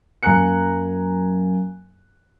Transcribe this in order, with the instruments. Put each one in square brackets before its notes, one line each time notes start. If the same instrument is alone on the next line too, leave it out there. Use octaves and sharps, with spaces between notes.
[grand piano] F#2 A#3 G#5 A#5 F#6 C#7